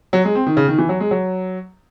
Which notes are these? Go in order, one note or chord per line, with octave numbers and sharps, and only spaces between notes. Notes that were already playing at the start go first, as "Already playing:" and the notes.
F#3
G#3
C4
D#3
C#3
D#3
E3
F#3
G#3
F#3